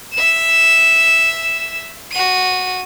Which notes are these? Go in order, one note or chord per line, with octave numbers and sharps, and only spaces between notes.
E5 E7
F#4 D#7